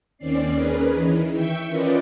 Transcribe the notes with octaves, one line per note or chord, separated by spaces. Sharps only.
D#2 D#3 C4 C#4 D5 C7
C#4 G#4 A#4 B4
D#3 E3
E5 G5 C#6
C#4 F4 A#4 B4 D5 D#5